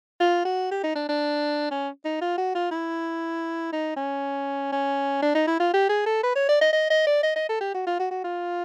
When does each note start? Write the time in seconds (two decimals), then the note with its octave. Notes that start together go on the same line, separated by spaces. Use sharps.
0.20 F4
0.45 F#4
0.71 G4
0.83 D#4
0.95 D4
1.09 D4
1.71 C#4
2.05 D#4
2.21 F4
2.38 F#4
2.55 F4
2.71 E4
3.73 D#4
3.96 C#4
4.72 C#4
5.22 D4
5.35 D#4
5.47 E4
5.60 F4
5.73 G4
5.89 G#4
6.06 A4
6.23 B4
6.35 C#5
6.49 D5
6.61 D#5
6.73 D#5
6.90 D#5
7.07 D5
7.23 D#5
7.36 D#5
7.49 A4
7.61 G4
7.74 F#4
7.87 F4
7.99 F#4
8.11 F#4
8.24 F4